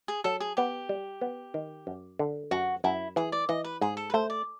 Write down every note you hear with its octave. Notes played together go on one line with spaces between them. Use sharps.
G#4
F#3 A4
G#4
B3 G4
G3
B3
D#3
F#2
D3
F#2 F#4
F#2 E4
E3 G#4
D5
E3 D#5
B4
G#2 G#4
A4
B4
A3 C5
D5